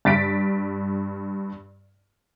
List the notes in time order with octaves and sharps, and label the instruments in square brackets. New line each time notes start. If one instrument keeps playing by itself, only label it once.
[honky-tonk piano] G2 A6 B6 D7